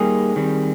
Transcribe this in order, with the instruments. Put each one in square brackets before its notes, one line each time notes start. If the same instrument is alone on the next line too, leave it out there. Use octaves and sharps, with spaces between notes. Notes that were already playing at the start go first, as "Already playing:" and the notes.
Already playing: [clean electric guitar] G3 A#3 D#4 G4 [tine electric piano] G#4
[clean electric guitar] D#3 G3 C4